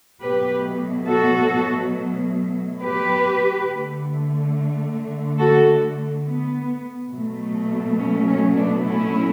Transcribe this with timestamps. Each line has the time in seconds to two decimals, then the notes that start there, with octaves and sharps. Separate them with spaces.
0.21 B2 F#3 A3 G4 B4
1.08 F#4 A4
2.80 G4 B4
3.66 D3 A3
5.39 F#4 A4
6.25 B3
7.12 B2 F#3 A3
7.98 C#4
8.27 C#4
8.55 B3 D4
8.84 C#4 E4